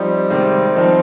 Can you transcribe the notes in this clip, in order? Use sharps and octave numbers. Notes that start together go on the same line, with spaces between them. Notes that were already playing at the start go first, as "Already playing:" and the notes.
Already playing: F3 G3 C4 D#4
C3 D#3 G#3 C4
D#3 F3 G3 C4 D#4